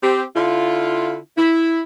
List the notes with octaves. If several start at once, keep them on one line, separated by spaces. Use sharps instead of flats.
C4 G4
D3 E4 F4
E4